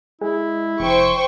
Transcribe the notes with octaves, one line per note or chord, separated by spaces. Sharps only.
G#3 E4
F1 C5 G5 C#6